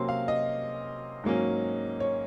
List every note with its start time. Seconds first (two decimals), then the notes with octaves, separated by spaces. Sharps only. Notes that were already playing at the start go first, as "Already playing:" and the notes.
Already playing: C3 F#3 A#3 C#4 C6
0.09 F5
0.28 D#5
1.24 G#2 F#3 A#3 C#4
2.00 C#5